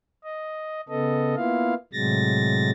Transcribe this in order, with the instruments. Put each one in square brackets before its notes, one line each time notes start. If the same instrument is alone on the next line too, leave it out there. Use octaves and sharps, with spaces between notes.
[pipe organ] D#5
C#3 B3 A4 D#5
A#3 B3 E4 F4 F5
A2 C3 F#3 G#3 A6 A#6